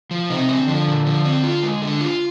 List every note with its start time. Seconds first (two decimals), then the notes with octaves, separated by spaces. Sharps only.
0.11 F3
0.29 C3 D#4
0.49 C4
0.58 D3
0.68 F3
0.87 A#2
1.06 F3
1.25 C4
1.44 F4
1.63 G#3
1.82 D3
2.01 F4